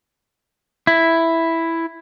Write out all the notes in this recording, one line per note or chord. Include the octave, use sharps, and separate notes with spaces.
E4